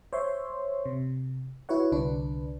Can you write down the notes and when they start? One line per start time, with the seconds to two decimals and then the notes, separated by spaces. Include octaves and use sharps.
0.13 C5 C#5 E5 C6
0.86 C3
1.69 E4 F#4 B4 C#5 F#5
1.92 C2 D3 D4 B4